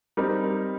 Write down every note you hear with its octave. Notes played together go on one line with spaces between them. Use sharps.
G3 C4 D#4 A#4